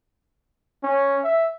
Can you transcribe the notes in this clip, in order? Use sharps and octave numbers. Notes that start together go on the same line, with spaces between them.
C#4
E5